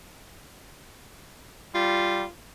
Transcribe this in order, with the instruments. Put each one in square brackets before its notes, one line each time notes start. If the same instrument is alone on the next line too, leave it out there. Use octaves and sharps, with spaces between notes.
[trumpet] G3 [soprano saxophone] F4